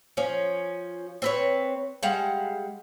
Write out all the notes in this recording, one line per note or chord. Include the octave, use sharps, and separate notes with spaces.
F3 C#4
C4 B4 C#5
G3 G#3 F5 F#5